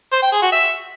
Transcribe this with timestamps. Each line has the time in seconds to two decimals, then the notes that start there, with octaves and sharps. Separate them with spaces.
0.12 C5
0.22 G5
0.32 G#4
0.42 F#4
0.52 E5